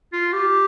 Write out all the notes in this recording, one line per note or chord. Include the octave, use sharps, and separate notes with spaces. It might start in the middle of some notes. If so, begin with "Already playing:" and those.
F4
G4